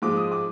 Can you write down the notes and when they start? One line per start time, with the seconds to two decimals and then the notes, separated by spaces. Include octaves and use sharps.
0.02 G#2 F3 G#3 D6
0.17 D#6
0.32 D6